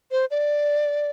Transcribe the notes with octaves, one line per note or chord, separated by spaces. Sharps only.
C5
D5